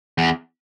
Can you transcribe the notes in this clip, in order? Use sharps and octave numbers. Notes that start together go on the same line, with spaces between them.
E2